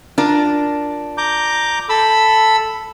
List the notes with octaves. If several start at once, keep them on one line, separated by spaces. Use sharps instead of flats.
D4 F4 A#4
A#5 D6 G6
A4 B5 E6